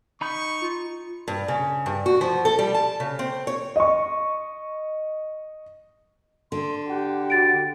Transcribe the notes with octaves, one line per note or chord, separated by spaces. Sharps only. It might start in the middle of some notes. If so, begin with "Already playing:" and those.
D#4 B5 C#6 G6
F4
G2
C#3
G2
F#4
F3
A4
G3
A5
C#3
C4
C#5
D#5 C#6
D3 C6
G4 F#5
F#4 A6 D7